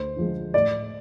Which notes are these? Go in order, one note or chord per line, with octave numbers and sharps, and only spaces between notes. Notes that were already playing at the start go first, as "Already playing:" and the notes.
Already playing: D2 C5
D3 F3 G#3
A2 D5